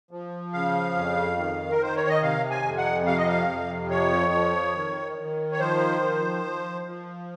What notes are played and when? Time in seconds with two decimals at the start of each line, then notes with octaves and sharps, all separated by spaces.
0.11 F3
0.53 C#3 F5
0.95 F2
1.38 D#3
1.69 A#4
1.79 D#3 C5
1.96 C#5
2.09 D#5
2.22 C3 F5
2.51 G#5
2.64 F2
2.78 F#5
3.06 C3 F5
3.17 D#5
3.28 F5
3.48 F2
3.90 F3 C#5
4.33 F3
4.75 D#3
5.18 D#3
5.52 C#5
5.59 F3 C5
6.02 F3
6.44 F3
6.86 F3